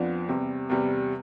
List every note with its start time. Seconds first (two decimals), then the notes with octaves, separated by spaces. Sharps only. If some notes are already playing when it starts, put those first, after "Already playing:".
Already playing: F2 F3 B3 D4
0.29 E2 C3 G3
0.70 E2 C3 G3